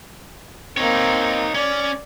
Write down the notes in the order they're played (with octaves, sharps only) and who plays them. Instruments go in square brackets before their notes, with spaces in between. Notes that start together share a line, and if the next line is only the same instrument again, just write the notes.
[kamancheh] A#3 C4 [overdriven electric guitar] D#4 C#5
[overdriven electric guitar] C#4 [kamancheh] D5